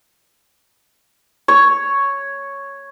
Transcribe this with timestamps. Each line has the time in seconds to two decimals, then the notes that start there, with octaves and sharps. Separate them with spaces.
1.48 C#5